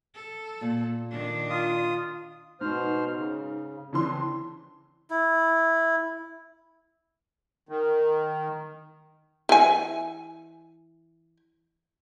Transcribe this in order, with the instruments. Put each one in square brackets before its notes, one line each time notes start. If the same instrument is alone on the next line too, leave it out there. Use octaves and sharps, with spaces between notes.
[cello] A4
[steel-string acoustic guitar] A#2
[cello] D#3 D4
[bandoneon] F4 D#6
[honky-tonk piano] G#2 [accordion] B2 C5 F6
[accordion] C#3
[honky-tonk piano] C#3 E3 C6 [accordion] C4 D4
[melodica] E4
[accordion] D#3
[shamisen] E3 G#5